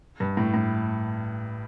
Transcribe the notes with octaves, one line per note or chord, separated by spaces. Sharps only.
G2
A2
A2